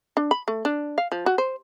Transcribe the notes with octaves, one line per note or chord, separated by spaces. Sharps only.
D4
B5
A3
D4
F5
F3
F#4
C5